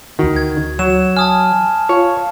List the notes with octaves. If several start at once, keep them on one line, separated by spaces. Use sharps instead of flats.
D2 D#3 F#4
G#6
F#3 E7
G#5 A5 D#6 F6
F4 C#5 F5